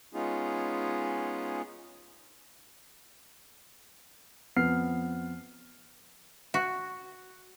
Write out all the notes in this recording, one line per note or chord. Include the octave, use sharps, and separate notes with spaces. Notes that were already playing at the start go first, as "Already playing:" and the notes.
G#3 B3 C#4 D#4 F4 G#4
F2 B3 F6 C7
F#4